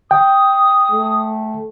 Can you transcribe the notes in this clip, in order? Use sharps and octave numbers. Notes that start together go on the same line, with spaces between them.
G5 D#6
A3